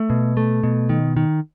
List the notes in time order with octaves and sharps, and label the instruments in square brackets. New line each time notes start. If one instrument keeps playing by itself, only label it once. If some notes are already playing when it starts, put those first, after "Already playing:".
Already playing: [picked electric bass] A3
B2
A3
B2
D#3
D#3